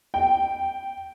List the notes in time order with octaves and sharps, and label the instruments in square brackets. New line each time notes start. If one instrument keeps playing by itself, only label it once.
[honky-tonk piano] G5